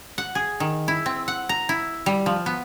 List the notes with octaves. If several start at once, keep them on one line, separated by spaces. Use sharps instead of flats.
F#5
G#4
D#3
E4
C4
F#5
A#5
E4
G3
F3
B3